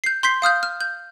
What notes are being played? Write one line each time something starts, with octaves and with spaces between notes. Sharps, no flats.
G6 C7
C6 G6 B6 C7
F5 D#6 F6 G6
F6
G6